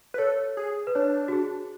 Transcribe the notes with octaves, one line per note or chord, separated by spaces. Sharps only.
B4
A4 C#5
G#4
B4
D4 C#5
F#4
G#4